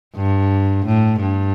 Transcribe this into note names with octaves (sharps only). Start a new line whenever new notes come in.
G2
A2
G2